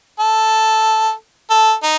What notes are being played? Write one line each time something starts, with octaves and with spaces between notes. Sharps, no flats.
A4
A4
D#4